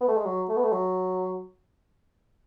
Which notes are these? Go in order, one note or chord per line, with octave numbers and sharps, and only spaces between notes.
B3
A3
G#3
F#3
A3
B3
A3
F#3